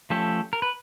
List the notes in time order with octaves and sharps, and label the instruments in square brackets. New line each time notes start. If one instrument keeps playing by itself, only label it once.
[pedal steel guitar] F3 A3 C#4 G4 A4
A#4
B4